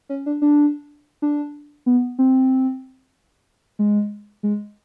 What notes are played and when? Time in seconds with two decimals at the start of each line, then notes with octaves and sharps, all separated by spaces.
0.09 C#4
0.26 D4
0.42 D4
1.22 D4
1.86 B3
2.19 C4
3.79 G#3
4.43 G#3